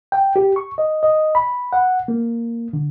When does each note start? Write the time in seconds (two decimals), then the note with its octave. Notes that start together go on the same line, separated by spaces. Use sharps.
0.12 G5
0.36 G4
0.56 C#6
0.78 D#5
1.03 D#5
1.35 B5
1.73 F#5
2.08 A#3
2.73 D3